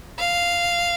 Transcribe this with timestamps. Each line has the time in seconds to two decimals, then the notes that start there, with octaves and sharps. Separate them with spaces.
0.19 F5